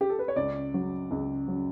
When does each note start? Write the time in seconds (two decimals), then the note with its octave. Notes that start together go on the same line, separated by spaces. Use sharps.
0.01 G4
0.10 A4
0.19 B4
0.28 C#5
0.36 C#2 D5
0.74 F#3
1.11 C#2
1.48 F#3